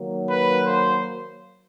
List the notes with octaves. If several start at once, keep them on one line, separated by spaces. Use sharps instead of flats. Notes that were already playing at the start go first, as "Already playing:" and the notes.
Already playing: D#3 F#3 A#3
B4
C5